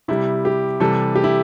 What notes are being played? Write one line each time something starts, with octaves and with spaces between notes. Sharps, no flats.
C3 G3 E4
G4
C3 E3 G3 A4
G4
E4